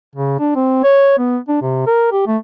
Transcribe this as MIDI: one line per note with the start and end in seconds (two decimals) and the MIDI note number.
0.15 0.35 49
0.40 0.53 62
0.56 0.84 60
0.84 1.16 73
1.18 1.38 59
1.48 1.57 62
1.62 1.83 48
1.87 2.10 70
2.12 2.23 67
2.27 2.37 57